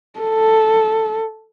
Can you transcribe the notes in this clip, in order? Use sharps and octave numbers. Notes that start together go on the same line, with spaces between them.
A4